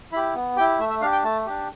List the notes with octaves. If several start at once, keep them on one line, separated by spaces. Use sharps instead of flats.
E4 G4 B5
B3
E4 G4 G5
A3 E5
E5
D4 G4 F5
G5
A3 A5
D4 G4